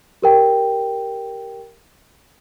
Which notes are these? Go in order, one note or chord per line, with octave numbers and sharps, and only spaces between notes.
G4 A#4 G5